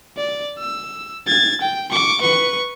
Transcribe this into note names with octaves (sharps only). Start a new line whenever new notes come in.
D5
E6
G#6 A6
G5
C#6 D6
B4 C#6